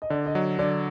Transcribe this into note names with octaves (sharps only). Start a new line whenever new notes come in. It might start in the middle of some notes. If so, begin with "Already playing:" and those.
D#5
D3 D5
D#5
F#3
D3 D5